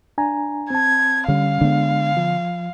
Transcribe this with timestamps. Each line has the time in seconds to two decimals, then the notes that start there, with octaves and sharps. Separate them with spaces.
0.18 D4 G#5 A#5
0.70 C4 A5 G#6
1.28 D3 G3 C#4 F5
1.61 D3 G#3 B3 D4
2.17 F3